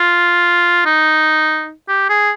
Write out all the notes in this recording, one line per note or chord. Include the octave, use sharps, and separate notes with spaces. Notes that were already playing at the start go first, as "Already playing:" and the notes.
Already playing: F4
D#4
G4
G#4